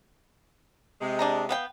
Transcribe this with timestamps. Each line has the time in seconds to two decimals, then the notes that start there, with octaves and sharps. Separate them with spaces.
1.01 C3 G#3
1.19 D4 D#5 A#5
1.49 B3 F5 G5